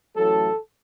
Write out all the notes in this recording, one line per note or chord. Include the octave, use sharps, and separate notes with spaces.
A1 A2 F#3 A3 A4